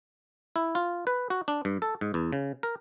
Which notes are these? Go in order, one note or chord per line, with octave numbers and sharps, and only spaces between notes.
E4
F4
B4
F#4
D4
G2
A4
G#2
E2
C#3
A#4